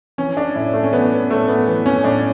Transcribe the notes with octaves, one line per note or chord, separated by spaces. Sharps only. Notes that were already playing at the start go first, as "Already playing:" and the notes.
E3 C#4
D4
A2 E4
A3
C#4
E3 B3
A2 A3
B3
E3
C#4
A2 D4